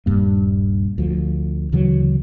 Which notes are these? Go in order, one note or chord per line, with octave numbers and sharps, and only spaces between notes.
D#1 G2 A#3
D2 F3
D2 C#3 E3 F#3